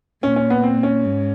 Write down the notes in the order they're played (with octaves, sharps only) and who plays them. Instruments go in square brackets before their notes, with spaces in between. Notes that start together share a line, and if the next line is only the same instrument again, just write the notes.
[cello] A#2 [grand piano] C#4
[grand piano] C#4
B3
C4
C#4
[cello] G#2